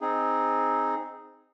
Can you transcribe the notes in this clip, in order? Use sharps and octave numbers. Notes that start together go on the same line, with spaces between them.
C4 D#4 G#4